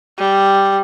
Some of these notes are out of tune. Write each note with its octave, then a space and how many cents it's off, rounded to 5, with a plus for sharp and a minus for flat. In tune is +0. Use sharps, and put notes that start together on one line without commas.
G3 +0